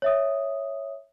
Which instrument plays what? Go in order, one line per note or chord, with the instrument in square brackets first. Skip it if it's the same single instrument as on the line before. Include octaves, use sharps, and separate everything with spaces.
[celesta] C#5 E5 D#6